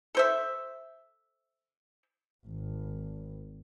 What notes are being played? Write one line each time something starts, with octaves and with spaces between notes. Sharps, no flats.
A4 C5 E5
G#1